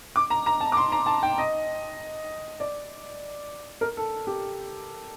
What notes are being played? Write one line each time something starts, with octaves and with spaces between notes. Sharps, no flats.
D6
A#5
A#5
A5
D6
C6
A#5
A5
G5
D#5
D5
A#4
A4
G4